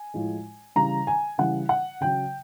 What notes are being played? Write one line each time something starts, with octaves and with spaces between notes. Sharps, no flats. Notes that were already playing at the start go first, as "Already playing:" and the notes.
Already playing: G#5
A2 F3 G#3
C#3 E3 G3 A#5
G#5
C#3 E3 G3 F#5
F#5
C#3 F#3 G5